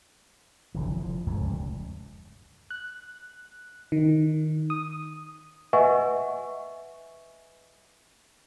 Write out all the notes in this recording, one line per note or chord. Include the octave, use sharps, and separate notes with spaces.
F1 D3 E3
F3
D1 C#2 G2 A3
F1 C#2 G2
F#6
D#3
D#6
B4 D#5 E5 F#5 G#5 C#6